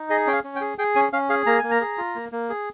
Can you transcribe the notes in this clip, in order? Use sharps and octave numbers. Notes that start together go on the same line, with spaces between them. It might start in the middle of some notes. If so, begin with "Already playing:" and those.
Already playing: D#4
G#4 D#5
C#4 G5
F5
C#4
G5
G#4
G#4 G5
C#4 G#5
C#4 F5
G#4 F5
A#3 A#5
A#3 G#5
A#5
G#4
F4
A#3
A#3
G#4